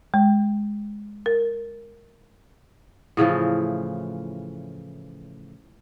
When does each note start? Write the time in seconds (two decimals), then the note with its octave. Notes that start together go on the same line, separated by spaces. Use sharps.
0.14 G#3
1.26 A#4
3.17 A2 C#3 E3 F3